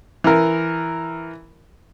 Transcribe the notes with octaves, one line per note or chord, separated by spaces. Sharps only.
E3 A#4